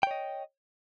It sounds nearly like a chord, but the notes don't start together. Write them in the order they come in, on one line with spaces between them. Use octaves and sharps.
G5 C#5 D#5